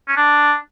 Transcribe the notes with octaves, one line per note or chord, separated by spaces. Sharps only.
C#4
D4